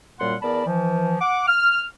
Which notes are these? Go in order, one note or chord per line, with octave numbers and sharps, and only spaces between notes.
F#2 A#2 G3 A#3 F#5 C6
E2 B3 A#4 D5 A5 B5
E3 F3
F#5 D6
F6